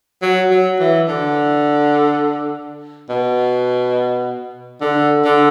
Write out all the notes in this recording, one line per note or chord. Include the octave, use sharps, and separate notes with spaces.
F#3
F#3
E3
D3
B2
D3
D3